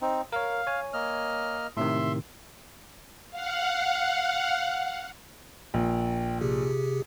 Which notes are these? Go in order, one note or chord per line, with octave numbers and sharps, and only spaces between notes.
C4 D#4
A#4 C#5 F5
C#5 G#5
A#3 D#5 F6
A2 C3 D#3 E5 C6
F5 F#5
A#1 G5
C3 G4 G#4